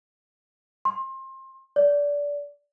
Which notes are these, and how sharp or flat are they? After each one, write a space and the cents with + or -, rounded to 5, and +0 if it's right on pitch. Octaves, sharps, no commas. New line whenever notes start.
C6 +25
D5 -20